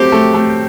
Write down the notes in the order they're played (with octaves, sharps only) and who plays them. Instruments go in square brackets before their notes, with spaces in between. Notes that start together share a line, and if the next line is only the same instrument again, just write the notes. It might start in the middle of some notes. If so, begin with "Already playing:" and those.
Already playing: [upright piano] F#3 A3 C4 [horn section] G4
[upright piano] A3
A3